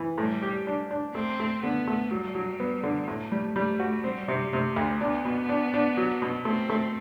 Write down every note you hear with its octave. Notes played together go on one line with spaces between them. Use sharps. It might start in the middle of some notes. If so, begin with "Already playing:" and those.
Already playing: E3
A2 G3
G4
D4
D4
A3 C4
A3
D3 B3
A3
F#3 G3
F#3
B3
D3
A2 A3
G3
G3 A3
F#4
G3 C4
C3
C3 A3
D2
B3 D4
B2
D4
D4
F#3
B2
A3 C4
A3